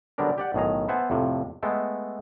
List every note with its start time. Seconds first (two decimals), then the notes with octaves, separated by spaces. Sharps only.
0.18 D3 F#3 G3 B3 D4 A#4
0.38 G4 D5 F#5
0.54 B1 A2 D#3 G#4 A#5
0.89 B3 C5 E5 F#5 G#5 A5
1.10 F2 A2 C3
1.63 G#3 A3 B3 A4 G5